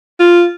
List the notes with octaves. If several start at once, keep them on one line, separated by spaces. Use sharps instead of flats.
F4